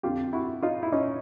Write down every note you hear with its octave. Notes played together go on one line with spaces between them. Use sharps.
F2 D3 F4 G4
E4 F#4
D#4 F4
E4
C#4 D#4